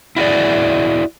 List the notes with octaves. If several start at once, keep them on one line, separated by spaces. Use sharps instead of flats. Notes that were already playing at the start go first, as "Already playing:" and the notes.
E4 F#4 G#4 D5